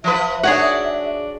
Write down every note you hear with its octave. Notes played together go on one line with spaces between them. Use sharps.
F3 B4 E5
D4 F#4 G#4 C#5 F#5